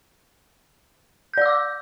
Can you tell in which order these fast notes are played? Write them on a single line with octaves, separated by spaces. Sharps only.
G6 D5 E6 D6